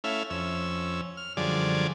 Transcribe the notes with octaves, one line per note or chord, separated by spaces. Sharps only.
A3 C#4 E4 E5 F5
F2 C#4 E6
F6
F#2 D3 F3 G3 G#4 D5